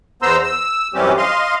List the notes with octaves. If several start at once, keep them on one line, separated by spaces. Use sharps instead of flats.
E2 B3 C5 A#5 C6 E6
E6
F#2 E3 G3 C4 C#4 G4
D#5 F5 C6